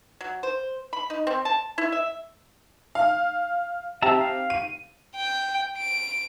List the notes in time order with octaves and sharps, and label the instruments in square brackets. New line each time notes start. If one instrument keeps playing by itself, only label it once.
[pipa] F#3
C5
B5
D#4
C4
A5
E4
E5
[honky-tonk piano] F5
[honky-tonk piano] C4 G4 [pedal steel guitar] E5 A5 A#5
[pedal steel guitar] F5
[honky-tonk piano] D#7
[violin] G5
D7